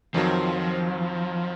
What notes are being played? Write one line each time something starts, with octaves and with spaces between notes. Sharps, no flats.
F2 D#3 F3 F#3 C4